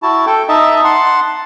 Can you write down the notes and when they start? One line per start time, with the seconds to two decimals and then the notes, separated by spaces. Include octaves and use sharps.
0.03 E4 F#4 A5
0.26 A4 G5
0.48 D#4 D#5 E5 A5
0.84 F#5 A5 C6